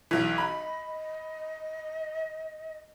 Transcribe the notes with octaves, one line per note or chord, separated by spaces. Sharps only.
B1 E3
D#5 B5